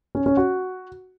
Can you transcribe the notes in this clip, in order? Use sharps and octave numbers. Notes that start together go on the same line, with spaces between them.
C#4
C#4
F#4